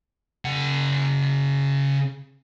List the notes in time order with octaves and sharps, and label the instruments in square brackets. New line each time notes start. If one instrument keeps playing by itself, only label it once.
[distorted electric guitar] C#3 F#5